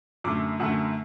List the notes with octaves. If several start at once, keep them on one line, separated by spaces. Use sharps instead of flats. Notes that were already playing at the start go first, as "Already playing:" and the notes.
F#2 D3 A3 D6
F#2 D3 A3 F#5